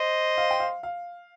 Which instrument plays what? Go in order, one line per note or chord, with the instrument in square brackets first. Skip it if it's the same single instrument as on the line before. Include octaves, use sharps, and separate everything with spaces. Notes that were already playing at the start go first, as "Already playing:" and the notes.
Already playing: [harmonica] C5 D#5
[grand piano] F5
G5
F5
F5